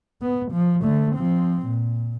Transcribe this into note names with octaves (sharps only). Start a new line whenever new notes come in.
B3
F3
D3 A3
F3 C4
A#2